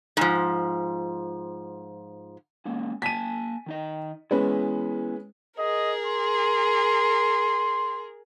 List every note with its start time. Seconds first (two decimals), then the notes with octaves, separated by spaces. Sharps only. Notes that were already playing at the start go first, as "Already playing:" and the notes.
0.17 G#2 F3
2.65 G#3 A#3 C#4
3.02 A#3 G#5 A5 B6 D#7
3.66 D#3 D#4 D#5
4.31 G#3 B3 C#4 E4 B4
5.59 G#4 A#4 D#5
6.07 C6